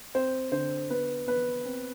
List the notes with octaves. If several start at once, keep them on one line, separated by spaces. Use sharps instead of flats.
C4 C5
D3 C5
B3 B4
B3 B4
C4